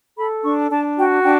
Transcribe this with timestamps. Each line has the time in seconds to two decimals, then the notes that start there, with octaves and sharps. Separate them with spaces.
0.17 A4 B5
0.44 D4 C#6
0.70 D4 A5
0.97 F#4 G5
1.23 D4 G5